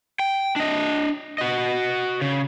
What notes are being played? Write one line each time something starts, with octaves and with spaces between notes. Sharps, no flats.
G5
D4 D#5
F#4 D#5
C#3